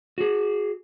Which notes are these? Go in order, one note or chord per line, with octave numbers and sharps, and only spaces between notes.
F#4 G#4